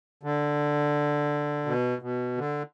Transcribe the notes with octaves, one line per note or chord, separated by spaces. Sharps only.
D3
B2
B2
D3